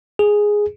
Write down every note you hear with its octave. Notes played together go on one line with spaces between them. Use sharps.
G#4